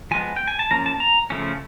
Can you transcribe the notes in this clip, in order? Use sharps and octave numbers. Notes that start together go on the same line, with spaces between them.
F3 G#3 B3 G#5
G5
G#5
A5
F3 A#3 C#4 A#5
A5
A#5
C#3 F3 A3 C#4